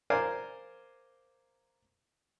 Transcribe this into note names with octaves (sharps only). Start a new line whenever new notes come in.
A#4 C5 D5 F5 G#5 A#5